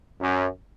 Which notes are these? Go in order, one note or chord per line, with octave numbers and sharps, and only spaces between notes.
F#2